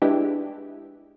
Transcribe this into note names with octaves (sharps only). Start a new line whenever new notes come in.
G#3 D4 E4 G4 B4 G5